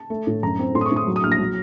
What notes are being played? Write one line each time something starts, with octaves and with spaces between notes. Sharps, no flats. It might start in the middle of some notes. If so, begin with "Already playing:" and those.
Already playing: A5
A3
A2
F#2 A#5
C4
A2 C6
D#6
C#6
A2 D#6
F#3
D#6
A#1 F6
A#6
F#3